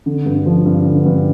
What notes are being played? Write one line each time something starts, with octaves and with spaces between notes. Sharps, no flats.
D3
G2
F3
G2
D3
G2